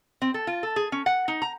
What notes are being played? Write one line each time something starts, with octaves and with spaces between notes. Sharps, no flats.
C4
A4
F4
A4
G#4
C#4
F#5
D#4
A#5